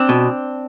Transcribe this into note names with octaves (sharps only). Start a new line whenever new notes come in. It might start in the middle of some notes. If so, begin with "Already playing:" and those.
Already playing: C4 D4
B2